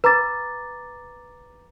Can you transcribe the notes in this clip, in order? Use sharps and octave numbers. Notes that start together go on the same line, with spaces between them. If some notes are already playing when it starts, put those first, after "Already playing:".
B4 A#5 D6 A6